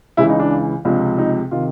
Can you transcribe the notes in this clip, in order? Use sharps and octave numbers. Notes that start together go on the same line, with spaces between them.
C#2 C#3 E3 E4
D#4
D4
C#2 C3 F3 D4
D#4
C3 D#3 F4